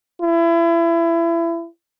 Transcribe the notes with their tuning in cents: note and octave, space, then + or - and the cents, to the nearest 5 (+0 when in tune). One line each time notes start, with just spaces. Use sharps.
E4 +30